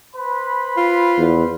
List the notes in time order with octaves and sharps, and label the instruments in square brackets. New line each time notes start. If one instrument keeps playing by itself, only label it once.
[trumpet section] B4 C5 B5
[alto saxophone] F4
[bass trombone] E2